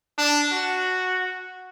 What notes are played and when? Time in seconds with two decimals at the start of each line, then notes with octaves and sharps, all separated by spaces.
0.18 D4
0.52 F#4